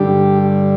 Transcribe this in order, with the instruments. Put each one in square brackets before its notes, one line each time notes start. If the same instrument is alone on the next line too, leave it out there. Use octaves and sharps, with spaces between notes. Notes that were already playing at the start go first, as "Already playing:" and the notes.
Already playing: [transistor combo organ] G2 D3 G3 G4